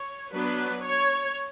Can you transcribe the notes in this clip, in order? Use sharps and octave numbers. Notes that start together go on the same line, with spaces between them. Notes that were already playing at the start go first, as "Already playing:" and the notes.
Already playing: C#5
F#3 B3 D4 B4
C#5